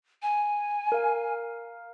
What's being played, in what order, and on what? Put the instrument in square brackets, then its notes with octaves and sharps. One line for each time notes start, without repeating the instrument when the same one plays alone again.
[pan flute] G#5
[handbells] A#4 F5